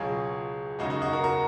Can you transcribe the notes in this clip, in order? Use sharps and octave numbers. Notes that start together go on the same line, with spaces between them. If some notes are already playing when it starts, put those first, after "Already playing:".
Already playing: C#2 B2 F#3 F4 G#4
F#2 C#3 G#3 D#4 F#4
D#4 F#4
D#4 F#4
F#4 A#4
F#4 A#4